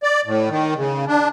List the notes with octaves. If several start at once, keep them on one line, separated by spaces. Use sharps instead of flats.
D5
A2
D#3
C#3
D4